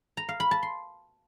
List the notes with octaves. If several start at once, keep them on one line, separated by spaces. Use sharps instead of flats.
A#5
F5
B5
A5
C6